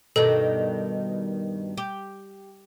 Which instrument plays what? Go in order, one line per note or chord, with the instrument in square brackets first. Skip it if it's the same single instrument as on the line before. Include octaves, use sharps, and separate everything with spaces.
[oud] G2 B2 D#3 [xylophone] A4
[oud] G4